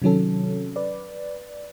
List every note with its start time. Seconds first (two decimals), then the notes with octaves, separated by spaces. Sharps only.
0.02 C3 D#3 F#3 C#4 A4
0.76 B4 D5